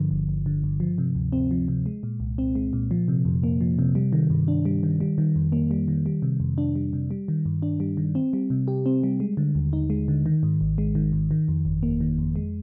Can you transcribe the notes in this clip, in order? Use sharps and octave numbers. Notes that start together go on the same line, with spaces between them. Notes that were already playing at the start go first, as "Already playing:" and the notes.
Already playing: G2 D3 F3
G1
G1
D3
G2
F3
C3
D2
C4
F3
C3
G#3
A#2
C2
C4
G#3
A#2
F3
C3
F2
A#3
F3
C3
G3
D#3
G2
D4
G3
D#3
G3
D#3
F2
A#3
G3
D#3
G3
C3
F2
D4
G3
C3
G3
D#3
G2
D4
G3
D#3
C4
G3
C3
G4
C4
G3
G#3
D3
D#2
D#4
G#3
D3
D#3
G#2
G#1
G#3
D#3
G#2
D#3
F2
G1
A#3
D#3
F2
G#3